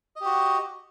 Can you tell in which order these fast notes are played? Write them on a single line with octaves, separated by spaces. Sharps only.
D#5 G4 F#4